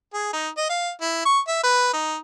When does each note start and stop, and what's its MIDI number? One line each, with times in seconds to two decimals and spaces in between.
0.13 0.29 68
0.33 0.48 63
0.57 0.67 75
0.69 0.91 77
1.01 1.20 64
1.25 1.39 85
1.47 1.60 76
1.63 1.90 71
1.93 2.16 63